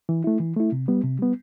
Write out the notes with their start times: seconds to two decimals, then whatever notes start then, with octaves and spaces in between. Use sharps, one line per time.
0.09 E3
0.24 A3 E4
0.40 E3
0.56 A3 E4
0.72 C3
0.88 G3 B3
1.04 C3
1.19 G3 B3